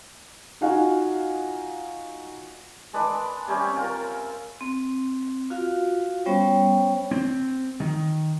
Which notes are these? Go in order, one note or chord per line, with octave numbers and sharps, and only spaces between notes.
D#4 F4 F#4 F5 F#5 G#5
G#3 D4 B4 D6
C3 G3 C4 C#4
F4 A#4
C4
F4 F#4 F5
G3 B3 C#4 C5 C#5 G5
C4
D#3